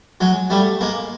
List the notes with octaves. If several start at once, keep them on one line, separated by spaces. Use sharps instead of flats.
F#3 G#3
G3 A3
G#3 A#3